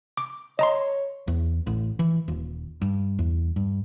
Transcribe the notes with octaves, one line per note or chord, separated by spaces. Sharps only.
D6
C#5 D#5 A#5 C6
E2
A1
E3
D#1
G2
E2
G2